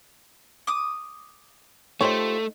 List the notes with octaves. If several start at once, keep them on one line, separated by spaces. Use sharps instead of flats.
D6 D#6
A3 D#4 F4 G4 C5 C#5